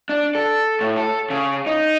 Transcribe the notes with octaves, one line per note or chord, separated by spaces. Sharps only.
D4
A4
A2
A4
C#3
D#4